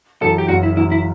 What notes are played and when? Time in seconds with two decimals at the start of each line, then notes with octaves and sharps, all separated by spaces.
0.21 F#2 E3 A4
0.38 G4
0.48 F#1 F#4
0.63 E4
0.77 F#2 E3 E4
0.92 E4